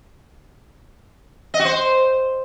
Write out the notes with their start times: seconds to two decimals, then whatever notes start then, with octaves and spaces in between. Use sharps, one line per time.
1.54 D#5
1.59 F#4
1.65 C5